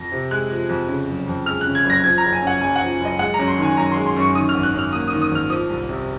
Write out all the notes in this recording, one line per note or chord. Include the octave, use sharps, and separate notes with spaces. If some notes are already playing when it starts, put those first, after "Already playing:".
Already playing: F2 F3 A#6
C3
G#3 F#6
F3
F2
C#3
F#1
F2
G#3 F6
C#3 F#6
G#6
F#1
A#6
F3 G#6
A#5
F#1
G#5
F#2
F#5
F#1 G#5
F#5
F3
F#1 D#5
G#3 F#5
F#2 A#5
C6
D#3 G#5
F#2 A#5
G#3 C6
C6
F#2 C#6
D#3 D#6
F6
G#1
F#6
F#2 F6
A#3 D#6
D#3 D#6
D#6
G#1 F6
F3 D#6
C2
C3